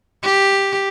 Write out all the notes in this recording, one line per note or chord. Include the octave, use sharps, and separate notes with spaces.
G4